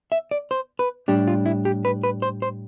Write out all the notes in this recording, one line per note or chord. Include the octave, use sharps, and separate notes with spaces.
E5
D5
C5
B4
A2 G3 D4 G4
F4
E4
G4
B4
B4
C5
C5